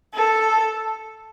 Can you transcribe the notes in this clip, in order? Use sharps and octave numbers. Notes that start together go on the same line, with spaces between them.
A4